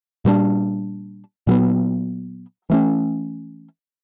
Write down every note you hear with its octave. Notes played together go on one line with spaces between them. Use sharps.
A#2 G3 B3 D4
A#2 F#3 B3
E3 A3 C#4